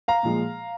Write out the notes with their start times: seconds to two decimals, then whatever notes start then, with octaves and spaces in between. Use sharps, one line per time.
0.08 F5 A#5
0.23 A#2 F3 G#3